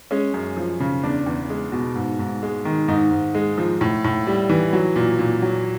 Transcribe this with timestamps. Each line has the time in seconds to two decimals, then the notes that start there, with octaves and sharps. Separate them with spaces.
0.11 G#3 C#4
0.34 F#2
0.57 F3
0.80 C#3
1.03 E2 D4
1.26 E2
1.50 G#3
1.72 B2
1.95 G#2
2.19 G#2
2.43 G#3
2.65 D#3
2.88 G#2 D#4
3.11 G#2
3.35 G#3
3.58 F3
3.81 A2
4.04 A2
4.27 G3
4.50 E3
4.73 F#3
4.96 A#2
5.19 A#2
5.42 F#3